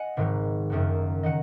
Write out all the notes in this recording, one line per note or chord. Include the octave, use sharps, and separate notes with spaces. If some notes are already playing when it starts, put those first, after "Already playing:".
Already playing: D#5 F#5 G#5
G#1 G#2 D#3 F#3
F#1 F#2 D#3 F#3
D#3 F#3 D#5 F#5